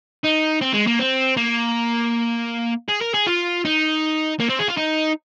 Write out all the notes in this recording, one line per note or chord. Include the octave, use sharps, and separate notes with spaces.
D#4
C4
G#3
A#3
C4
A#3
G#4
A#4
G#4
F4
D#4
A#3
C4
G#4
F4
D#4